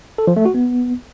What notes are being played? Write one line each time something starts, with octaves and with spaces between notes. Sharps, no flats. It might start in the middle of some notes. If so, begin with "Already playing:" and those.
A4
F3
A3
F#4
B3